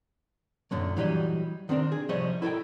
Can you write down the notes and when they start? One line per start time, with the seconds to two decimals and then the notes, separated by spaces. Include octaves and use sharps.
0.71 F#2 A#2 D3 F#3
0.97 E3 F#3 G3 G4 D#5
1.69 D#3 C4 D4 A#4
1.92 G#4
2.09 C2 F3 G3 C5 C#5 D#5
2.42 E4 A4 A#4 G5